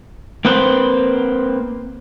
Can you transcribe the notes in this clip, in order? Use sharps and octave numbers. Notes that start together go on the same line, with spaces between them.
A#3 C4 B4 C5